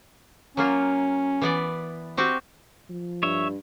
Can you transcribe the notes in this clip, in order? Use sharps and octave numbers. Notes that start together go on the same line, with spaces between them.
F#3 A#3 C#4 F4
E3 B3 D5
C4 F#4 G4
F3
G2 C#5 E5